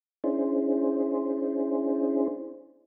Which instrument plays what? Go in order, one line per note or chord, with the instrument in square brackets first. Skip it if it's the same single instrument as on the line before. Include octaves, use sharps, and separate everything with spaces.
[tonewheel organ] C#4 D4 E4 G#4 C5